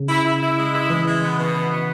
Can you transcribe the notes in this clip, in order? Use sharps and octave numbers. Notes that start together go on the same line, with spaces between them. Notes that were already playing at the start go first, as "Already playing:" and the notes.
Already playing: C#3
E4
E4
E4
G#3
E4
E3 G#3
G#3
B3
B2
B3
B3